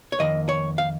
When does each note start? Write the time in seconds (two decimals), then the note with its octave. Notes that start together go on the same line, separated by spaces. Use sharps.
0.12 C#5
0.20 F2 D#3 A#3 D#5
0.49 C#5
0.78 F5